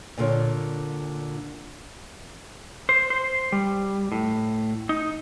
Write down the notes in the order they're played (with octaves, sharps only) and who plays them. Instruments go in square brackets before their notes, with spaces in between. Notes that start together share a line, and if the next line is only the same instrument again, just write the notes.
[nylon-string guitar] A#2 D3 F4 C#5
[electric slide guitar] C5
C5
G3
A2
D#4